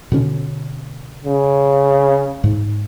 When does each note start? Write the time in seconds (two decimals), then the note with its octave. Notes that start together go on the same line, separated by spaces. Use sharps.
0.12 B2 D3 C#4
1.25 C#3
2.44 G#2